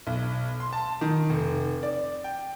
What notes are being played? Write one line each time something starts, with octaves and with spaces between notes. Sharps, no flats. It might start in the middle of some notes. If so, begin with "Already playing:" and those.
B1
C6
A5
D#3
F1
D5
G5